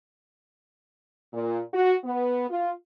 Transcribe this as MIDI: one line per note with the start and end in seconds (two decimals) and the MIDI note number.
1.33 1.60 46
1.74 1.94 66
2.04 2.46 59
2.49 2.71 65